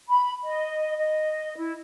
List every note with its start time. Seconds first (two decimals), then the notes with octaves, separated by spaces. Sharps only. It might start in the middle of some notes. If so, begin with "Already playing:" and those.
0.08 B5
0.44 D#5
0.97 D#5
1.57 E4